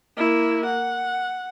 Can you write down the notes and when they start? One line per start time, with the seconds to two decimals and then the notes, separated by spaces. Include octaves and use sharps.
0.17 A#3 E4
0.66 F#5